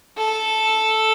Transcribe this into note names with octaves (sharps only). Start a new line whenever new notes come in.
A4